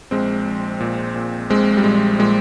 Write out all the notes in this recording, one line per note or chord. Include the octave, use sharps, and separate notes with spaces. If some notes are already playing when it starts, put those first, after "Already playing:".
A#1 G#3 C4
A#1
A#2
A#2
A#1 G#3 C4
G3
A#1 G#3
A#2 G#3